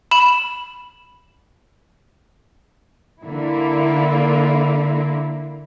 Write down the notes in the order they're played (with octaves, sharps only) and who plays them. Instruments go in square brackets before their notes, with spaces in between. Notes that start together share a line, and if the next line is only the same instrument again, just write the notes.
[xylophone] B5 E7 F#7
[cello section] D3 A#3 E4